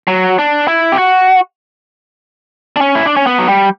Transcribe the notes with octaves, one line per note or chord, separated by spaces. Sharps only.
F#3
D4
E4
G4
F#4
D4
C#4
E4
D4
C#4
B3
F#3
G3